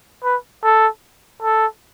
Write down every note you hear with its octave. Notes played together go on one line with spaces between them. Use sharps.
B4
A4
A4